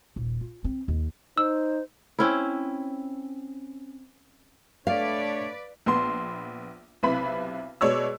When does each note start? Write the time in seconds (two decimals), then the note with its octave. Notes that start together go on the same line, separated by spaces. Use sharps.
0.16 D#1
0.41 F4
0.64 C4
0.88 D#2
1.38 D#4 C5 E6
2.19 C4 C#4 E4
4.87 A3 D4 B4 C#5 D5 F5
5.86 A#1 B3 C6
7.03 B1 C3 E4 B4 B5
7.81 B2 G#3 C#5 D5 E6